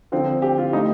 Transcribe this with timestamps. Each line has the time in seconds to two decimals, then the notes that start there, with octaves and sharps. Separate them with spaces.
0.12 D3 F3 C4
0.42 G4
0.58 F4
0.73 D3 A3 C4 D#4